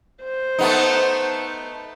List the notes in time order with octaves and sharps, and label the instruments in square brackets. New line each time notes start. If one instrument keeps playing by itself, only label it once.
[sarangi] C5
[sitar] A3 B3 D#4